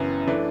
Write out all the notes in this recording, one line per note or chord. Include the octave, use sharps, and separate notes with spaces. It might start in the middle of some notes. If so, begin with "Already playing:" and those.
Already playing: F#1 F#2 E3 B3
E3 A3 D4